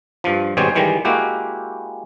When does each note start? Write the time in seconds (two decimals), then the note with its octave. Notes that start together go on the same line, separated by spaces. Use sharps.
0.24 G2 F3
0.57 G#1 B2 G3 G#4 C5 C#5
0.75 D#3 E3 G3 G#3
1.05 G#3 A#3 E4 F#4 G4